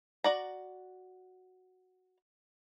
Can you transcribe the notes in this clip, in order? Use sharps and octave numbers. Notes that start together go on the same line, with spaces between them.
F#4 D5 A#5